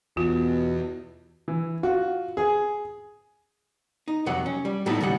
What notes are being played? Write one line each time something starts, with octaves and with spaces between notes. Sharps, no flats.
E2 B2 F4
E3
F4 F#4
G#4
D#4
F2 C3 F#3 F#5
C#4
G3
A2 F#3 A3 B3 D#4 E4
D#2 C#3 G3 F#5